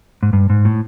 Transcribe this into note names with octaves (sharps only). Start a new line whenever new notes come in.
G#2
G2
G#2
A2